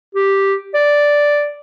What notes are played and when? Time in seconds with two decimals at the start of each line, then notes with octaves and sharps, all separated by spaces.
0.15 G4
0.74 D5